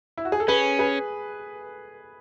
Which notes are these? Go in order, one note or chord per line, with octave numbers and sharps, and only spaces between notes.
E4
F#4
G#4
A4
C#4 G#4 B4
G#4 B4